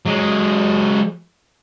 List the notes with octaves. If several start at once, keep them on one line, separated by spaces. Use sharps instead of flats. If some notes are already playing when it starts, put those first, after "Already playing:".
F#3 G#3